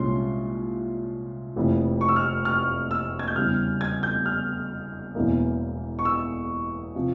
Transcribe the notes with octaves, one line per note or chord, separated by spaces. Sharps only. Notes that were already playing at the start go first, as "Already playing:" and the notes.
Already playing: C2 A#2 G#3 C#4 C6
F1 F2 E3 A#3
C#6
E6
F6
F6
E6
G#6
G6
E2 C#3 G3 F6
G#6
G6
F6
E1 E2 E3 A#3
C#6
E6
C3 F3